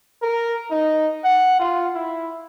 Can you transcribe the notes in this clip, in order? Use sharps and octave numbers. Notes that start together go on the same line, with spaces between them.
A#4
D#4
F#5
F4
E4